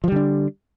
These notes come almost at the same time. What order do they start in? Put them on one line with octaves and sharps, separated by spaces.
F3 G3 D3 D4